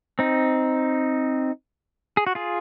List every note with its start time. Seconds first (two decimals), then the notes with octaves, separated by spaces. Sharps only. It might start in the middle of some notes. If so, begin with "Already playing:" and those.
0.19 C4 D#4
2.17 G#4
2.27 F#4
2.35 F4 G#4